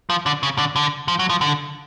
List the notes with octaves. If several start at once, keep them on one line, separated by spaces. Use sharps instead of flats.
F3
D3
C#3
D3
D3
F3
F#3
F3
D3